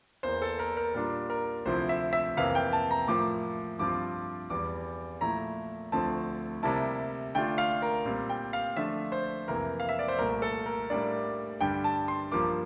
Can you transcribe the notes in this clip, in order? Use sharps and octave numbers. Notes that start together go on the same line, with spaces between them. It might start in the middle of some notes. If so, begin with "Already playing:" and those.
E2 E3 A#3 C5
A4
A#4
A#4
A#2 G3 D4 F4 A#4
A#4
D2 C3 F3 C4 E4 C5
E5
E5
F2 C3 E3 A#3 F5
G5
A5
A#5
A2 F3 A#3 D6
G2 F3 C4 F4 D6
E2 E3 G3 D6
A#2 F3 A3 E4 A#5
D2 D3 F3 A3 C4 A5
C3 G3 A#3 E4 A5
D3 A3 D4 F4 G5
F5
A#4
A#2 G3 C4
G5
F5
D3 F3 A3 D4 F4 E5
C5
F2 C3 E3 A#3 A#4
F5
E5
D5
C5
C2 A#2 A3 A#4
A4
A#4
A2 G3 A#3 D4 D5
G2 D3 G3 G5
A5
C6
G2 F3 A#3 D6